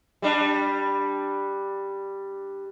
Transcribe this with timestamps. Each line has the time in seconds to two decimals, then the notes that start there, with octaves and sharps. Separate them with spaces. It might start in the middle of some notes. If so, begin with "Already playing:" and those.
0.22 G3 D4